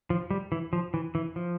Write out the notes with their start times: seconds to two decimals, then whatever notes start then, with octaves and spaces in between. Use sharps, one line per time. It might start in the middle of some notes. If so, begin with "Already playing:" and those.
0.10 F3
0.30 G3
0.52 E3
0.73 F3
0.94 E3
1.15 E3
1.36 F3